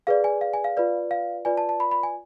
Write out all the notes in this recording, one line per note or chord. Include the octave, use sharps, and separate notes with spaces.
G#4 B4 D5 F5
G#5
F5
G#5
F5
F4 B4 D5
F5
F4 B4 D5 G#5
A5
A5
B5
B5
G#5